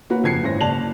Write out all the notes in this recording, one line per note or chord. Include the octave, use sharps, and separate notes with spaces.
A#3 F#4 B4 C#5
F#1 F2 G#6 C7 C#7
G#1 C#4 E4 C5 A#6
F#1 D5 A5 F7 F#7